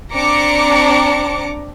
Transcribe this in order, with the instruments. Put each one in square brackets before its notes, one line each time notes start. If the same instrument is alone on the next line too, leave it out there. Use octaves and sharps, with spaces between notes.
[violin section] C4 D4 A#5 D6 C#7